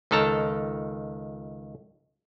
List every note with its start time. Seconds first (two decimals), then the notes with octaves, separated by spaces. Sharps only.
0.11 C#2 D#3 A4 A5 A#5